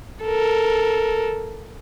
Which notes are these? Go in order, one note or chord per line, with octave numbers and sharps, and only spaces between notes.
A4 A#4